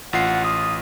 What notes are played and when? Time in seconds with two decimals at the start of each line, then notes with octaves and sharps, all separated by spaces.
0.13 A1 F4 F#5 C7
0.44 D#6